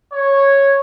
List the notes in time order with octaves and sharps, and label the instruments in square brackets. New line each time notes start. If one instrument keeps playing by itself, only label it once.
[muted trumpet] C#5